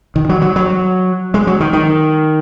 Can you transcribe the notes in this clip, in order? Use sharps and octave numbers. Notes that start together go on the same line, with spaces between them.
D#3
F#3
F#3
F#3
G#3
F#3
D#3
D#3